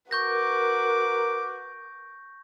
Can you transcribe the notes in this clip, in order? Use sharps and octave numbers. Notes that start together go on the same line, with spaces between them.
F#4 A#4 B4 C#6 D6 G6 A#6